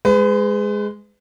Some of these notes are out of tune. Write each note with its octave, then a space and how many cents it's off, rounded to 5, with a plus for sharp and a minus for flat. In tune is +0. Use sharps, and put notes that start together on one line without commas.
G#3 +0 B4 +35